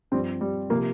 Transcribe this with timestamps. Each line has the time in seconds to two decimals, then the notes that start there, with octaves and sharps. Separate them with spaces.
0.11 G2 F3 G3 C4
0.41 G3
0.70 C3 F3 A#3